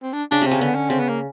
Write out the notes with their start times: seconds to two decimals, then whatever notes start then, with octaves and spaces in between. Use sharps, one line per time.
0.03 C4
0.13 D4
0.31 C#3 D4
0.41 C3 C4
0.51 C#3
0.61 D3 B3
0.75 C#4
0.90 C#3 C4
1.00 B3
1.09 A#3